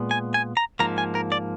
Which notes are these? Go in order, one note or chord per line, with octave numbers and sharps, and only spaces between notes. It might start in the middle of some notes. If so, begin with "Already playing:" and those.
Already playing: A#2 G#3 B3
G#5
G#5
A#5
G#2 F3 A#3 A#5
G#5
A#4
D5